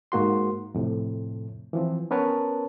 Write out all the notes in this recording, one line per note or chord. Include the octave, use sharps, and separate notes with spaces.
G#2 A#3 F#4 C6
F2 A2 C3
E3 F3 C4
B3 C#4 A#4 B4 C#5 A5